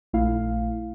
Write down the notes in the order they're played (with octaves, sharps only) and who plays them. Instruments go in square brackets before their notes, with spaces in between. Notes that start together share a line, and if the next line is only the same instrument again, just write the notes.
[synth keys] A#1 A3 E4 F5